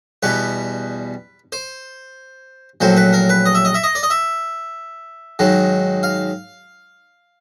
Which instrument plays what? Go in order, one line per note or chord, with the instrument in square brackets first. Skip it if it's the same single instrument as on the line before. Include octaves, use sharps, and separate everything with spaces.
[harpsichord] E2 B2 G3 B4
C5
A#1 A2 F#3 C5
B4
A#4
B4
D#5
E5
D#5
E5
D#5
D5
D#5
E5
G#2 D#3 F#3
F5